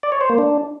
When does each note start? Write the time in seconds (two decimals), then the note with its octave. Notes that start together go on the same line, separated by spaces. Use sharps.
0.03 D5
0.12 C#5
0.21 C5
0.30 A#3
0.38 D4